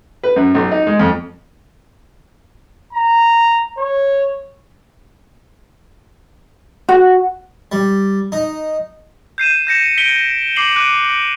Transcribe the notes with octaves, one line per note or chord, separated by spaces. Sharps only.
B4
F#2
B1
D#4
G#3
F2
A#5
C#5
F#4
G3
D#4
G6 C7 D#7 E7
G6 A#6 C#7 E7
B6 C#7 D7 G7
D6 C7 F#7 G7
D6 F#6 D7 D#7 F#7